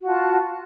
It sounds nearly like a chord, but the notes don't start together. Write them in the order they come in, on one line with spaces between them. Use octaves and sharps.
F#4 F4 A5